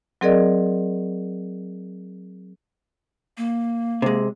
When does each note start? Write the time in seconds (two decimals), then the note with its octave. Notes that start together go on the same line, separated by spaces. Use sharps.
0.21 F#3 C4 G#4 A#4 D5 D#5
3.37 A#3
4.02 C3 G#3